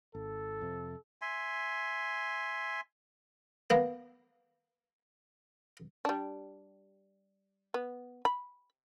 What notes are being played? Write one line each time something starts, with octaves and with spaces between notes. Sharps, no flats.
G#1 A4
F2 C3
E5 G#5 C6
A#3 B3
G3 D4
B3
B5